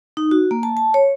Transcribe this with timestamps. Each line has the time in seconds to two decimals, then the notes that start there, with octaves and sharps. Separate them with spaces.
0.17 D#4
0.31 F#4
0.51 A#3
0.63 A5
0.77 A5
0.94 C#5